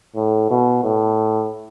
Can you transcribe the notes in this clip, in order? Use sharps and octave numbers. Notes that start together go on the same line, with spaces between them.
A2
B2
A2